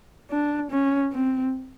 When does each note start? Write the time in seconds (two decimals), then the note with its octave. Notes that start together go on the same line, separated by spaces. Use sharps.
0.31 D4
0.71 C#4
1.12 C4